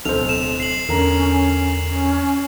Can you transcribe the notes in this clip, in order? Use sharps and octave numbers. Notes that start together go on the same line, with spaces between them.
D1 B1 A4 C5 F6 F7
E7
C7 F#7
E2 D3 C#4 A#4 A#5
C#4